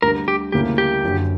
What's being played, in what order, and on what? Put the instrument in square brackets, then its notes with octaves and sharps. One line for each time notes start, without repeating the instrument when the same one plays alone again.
[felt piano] D2 D3 G3 [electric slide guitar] A#4
[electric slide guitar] G4
[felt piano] D2 C#3 G3 A#3 E4 [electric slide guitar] G4
[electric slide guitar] G4
[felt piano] F#1 F#2 D3 F#3